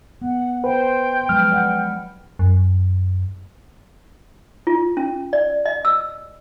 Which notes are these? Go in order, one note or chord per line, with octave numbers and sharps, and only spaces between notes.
B3 F#5
B4 C5 G5
F3 F#3 G#3 B4 F6
D5 F#5
F#2
F4
C#4
D5
D#5
E6